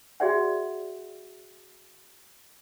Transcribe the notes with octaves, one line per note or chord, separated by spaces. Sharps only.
F#4 G#4 D5 E5 F#5